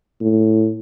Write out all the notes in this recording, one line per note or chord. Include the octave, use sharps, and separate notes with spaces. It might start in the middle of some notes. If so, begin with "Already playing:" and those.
A2